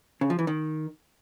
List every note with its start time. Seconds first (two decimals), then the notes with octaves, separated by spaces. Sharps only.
0.21 C#3
0.30 F3
0.39 E3
0.47 D#3